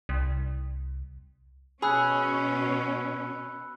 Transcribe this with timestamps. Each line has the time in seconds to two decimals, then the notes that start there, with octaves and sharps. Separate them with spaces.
0.09 C2
1.82 B2 C#4 G#4 B5 E6 F#6